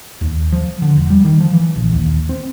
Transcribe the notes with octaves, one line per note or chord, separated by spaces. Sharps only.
D#2
F3
D3
E1
G3
D#3
F3
E3
A#1
D#2
C4